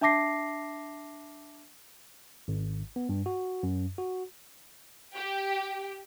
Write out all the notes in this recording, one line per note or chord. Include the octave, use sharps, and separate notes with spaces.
D4 E5 A5 D6 A#6 C7
G#1
B3
G2
F#4
F#2
F#4
G4